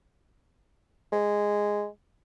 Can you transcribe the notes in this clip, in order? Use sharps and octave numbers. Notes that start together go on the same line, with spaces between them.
G#3